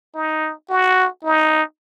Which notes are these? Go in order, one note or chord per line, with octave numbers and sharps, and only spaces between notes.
D#4
F#4
D#4